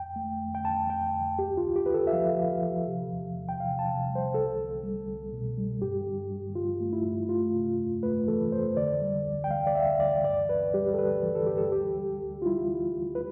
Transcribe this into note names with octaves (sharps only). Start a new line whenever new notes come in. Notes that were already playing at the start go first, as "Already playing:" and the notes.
Already playing: F2 G5
A3
F2
G5
F2 A5
F2 G5
F2
D2 G4
F4
D2
G4
D2 B4
A4
E5
F3 F5
F3
F3
C3
E2
E2
G5
C3 F5
A5
C3
G3
C5
C2 A4
C2
G3
C2
B2
G3
G2 G4
G2
G2
G2 F4
A3
E4
G2
A3 F4
C3
F2
A3 B4
E3 A4
F2 C5
D3 D5
G3
D2
G5
D2 F5
D5
D2 E5
D2 D5
G2 D5
E3 B4
G3 G4
A4
G3 B4
E3
A4
G2 G4
A4
D2 G4
G3
D2
F4
G3 E4
D2
D2
B4